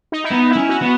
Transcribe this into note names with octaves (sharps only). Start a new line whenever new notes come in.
D#4
E4
B3 D#4
E4
C#4
F#4
B3